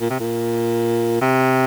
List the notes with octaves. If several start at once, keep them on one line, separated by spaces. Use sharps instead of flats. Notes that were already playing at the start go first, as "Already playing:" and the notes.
A#2
C3
A#2
C3